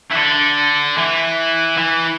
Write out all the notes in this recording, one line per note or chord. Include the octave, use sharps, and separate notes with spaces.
E3
D3
E3
E3